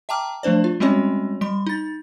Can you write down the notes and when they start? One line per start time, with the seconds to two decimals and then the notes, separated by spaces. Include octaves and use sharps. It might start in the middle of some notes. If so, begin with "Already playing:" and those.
0.09 E5 G5 A5 A#5 D6 F6
0.43 F3 A3 D4 C5 D5
0.64 F4
0.80 G3 G#3 C4 C#4 F#4 C#5
1.41 G3 C6
1.66 D#4 A6